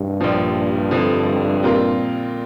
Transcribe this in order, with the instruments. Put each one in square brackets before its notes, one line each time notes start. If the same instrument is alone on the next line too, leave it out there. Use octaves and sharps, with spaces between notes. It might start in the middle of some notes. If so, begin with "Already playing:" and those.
Already playing: [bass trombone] G2
[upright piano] A#1 A#2 F3
F2 D3 F3
A#2 G3 C4 F4 A#4